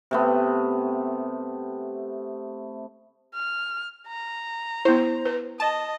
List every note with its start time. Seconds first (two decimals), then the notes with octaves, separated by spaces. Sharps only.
0.11 C3 A3 B3
3.34 F6
4.07 A#5
4.85 B3 E4 C5
5.25 B4
5.60 D#5 A5